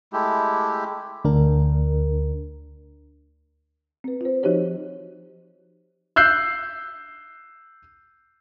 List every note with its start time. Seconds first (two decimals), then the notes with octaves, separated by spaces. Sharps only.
0.13 G#3 A3 E4 G4
1.25 D2 D4 A#4
4.04 C4 B4
4.21 F4 C5
4.43 F3 D#4 F#4 G4 C#5
6.16 E6 F#6 G6 C7